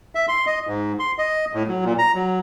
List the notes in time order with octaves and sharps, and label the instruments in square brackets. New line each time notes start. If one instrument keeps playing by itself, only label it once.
[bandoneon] E5
C6
D#5
G#2
C6
D#5
A2
F#3
A#2
A#5
F#3